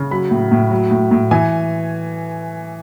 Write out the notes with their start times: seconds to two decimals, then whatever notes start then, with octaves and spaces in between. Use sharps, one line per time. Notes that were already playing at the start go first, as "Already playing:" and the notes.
Already playing: C#3
0.11 F#3 B5
0.31 A2
0.52 A2
0.71 F#3
0.91 A2
1.11 A2
1.31 E3 G#5